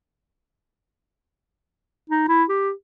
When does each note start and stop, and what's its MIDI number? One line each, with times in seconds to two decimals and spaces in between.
2.10 2.27 63
2.28 2.44 64
2.49 2.71 67